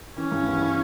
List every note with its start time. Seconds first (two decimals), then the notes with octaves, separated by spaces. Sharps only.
0.16 E3 C#4
0.32 G2
0.46 B3
0.61 E4